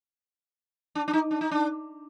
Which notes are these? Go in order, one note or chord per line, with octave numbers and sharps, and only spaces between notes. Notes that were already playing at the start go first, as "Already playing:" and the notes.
D4
D4
D#4
D4
D#4
D4